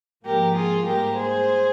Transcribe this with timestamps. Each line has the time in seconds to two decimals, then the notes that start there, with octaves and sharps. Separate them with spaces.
0.25 G#2 F3 A#3 G4 A#4
0.55 F4 G#4
0.86 G#2 G3 A#3 G4 A#4
1.16 G#4 C5